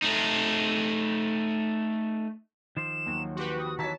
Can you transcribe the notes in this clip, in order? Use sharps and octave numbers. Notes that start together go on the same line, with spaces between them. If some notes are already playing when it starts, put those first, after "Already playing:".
A3 D#4
D#3 F3 C5 E7
D#2 F#3
F#4 G4 B4 C6
F#4 D#6
D#3 E3 F#3 C#5 A5 A#5 B6